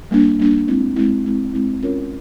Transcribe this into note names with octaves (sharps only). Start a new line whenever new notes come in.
G3 A#3 D4
G3 A#3 D4
G#3 C4 E4
G#3 C4 E4
G#3 C4 E4
G#3 C4 E4
C#4 F4 A#4 C#5